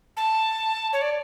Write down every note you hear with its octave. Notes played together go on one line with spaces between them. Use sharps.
A5
C#5
D5